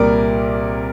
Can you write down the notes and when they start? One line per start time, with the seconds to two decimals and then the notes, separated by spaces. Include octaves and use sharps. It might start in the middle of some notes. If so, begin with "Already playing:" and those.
Already playing: C2 A#2 G3 A#4 D5